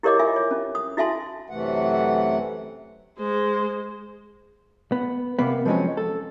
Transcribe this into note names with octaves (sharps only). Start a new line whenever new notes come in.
E4 G4 A#4 C#5 D#5 D6
F4 E5 G#5
C#5
C#4
D#6
E4 F#4 E5 G#5 A5 C6
F#2 C3 E3 A3 F#5
G#3 C5
B3
C3 A#3 B3
F3 F#3 G#3 C4 C#4
A4